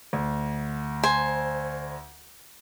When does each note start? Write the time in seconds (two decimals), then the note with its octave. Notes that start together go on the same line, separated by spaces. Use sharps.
0.13 D2
1.03 C5 G#5